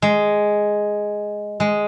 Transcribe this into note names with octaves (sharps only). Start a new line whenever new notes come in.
G#3
G#3